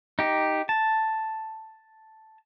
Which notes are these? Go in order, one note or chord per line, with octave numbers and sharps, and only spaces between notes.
D#4 G4
A5